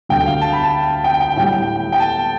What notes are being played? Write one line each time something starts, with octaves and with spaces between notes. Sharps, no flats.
D2 D3 G3 G5
F5
A5
B5
A5
G5
G5
A2 G3 G5
G5
G5
A5